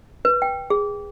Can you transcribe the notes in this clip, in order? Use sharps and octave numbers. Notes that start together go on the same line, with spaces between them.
B4
G5
G#4